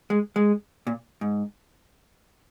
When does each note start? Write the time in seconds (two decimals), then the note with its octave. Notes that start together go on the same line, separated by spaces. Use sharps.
0.10 G#3
0.36 G#3
0.87 A#2
1.21 G#2